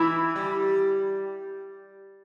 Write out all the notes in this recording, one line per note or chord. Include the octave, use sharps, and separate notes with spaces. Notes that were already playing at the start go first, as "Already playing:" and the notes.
Already playing: E3 E4
G3